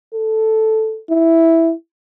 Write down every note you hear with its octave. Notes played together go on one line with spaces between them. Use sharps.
A4
E4